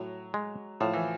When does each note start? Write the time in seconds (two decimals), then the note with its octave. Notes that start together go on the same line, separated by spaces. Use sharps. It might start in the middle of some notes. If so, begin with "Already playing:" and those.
Already playing: A2 F#3
0.34 G#3
0.81 A2 F3
0.93 E3